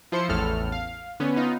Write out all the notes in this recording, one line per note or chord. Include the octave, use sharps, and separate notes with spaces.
F3 E4 C5 C6 C7 C#7
A1 E2 A2 A4 F6
F5
D3 B3 C#4
B3 D#4 F4